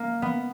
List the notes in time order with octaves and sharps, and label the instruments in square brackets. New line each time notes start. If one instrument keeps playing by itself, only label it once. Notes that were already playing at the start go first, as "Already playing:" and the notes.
Already playing: [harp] A#3
B3